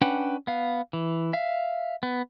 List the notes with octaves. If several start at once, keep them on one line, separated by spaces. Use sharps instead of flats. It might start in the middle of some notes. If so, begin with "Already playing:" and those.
C#4 D4 B4 F#5 G5
B3 F5
E3
E5 F5
B3